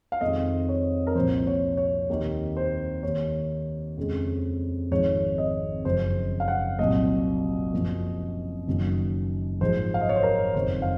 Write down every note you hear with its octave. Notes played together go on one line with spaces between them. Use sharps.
F5
F2 D#3 G#3 D#5
C#5
A#4
C2 A#2 F3 C5
C#5
C#5
D#2 D#3 A#3
C5
D#2 D#3 A#3 C#5
F2 C#3 G#3
G#1 G#2 F3 G#3 C#5
D#5
F#1 F#2 F3 G#3 C5
F5
F#5
C2 A#2 F#3 A#3 D#5
F#2 C#3 F3 A#3
F#1 F#2 D#3 F#3 A#3
A#1 G#2 F3 C5
F5
D#5
C#5
C5
A#4
F#1 F2 D#3 C5
F5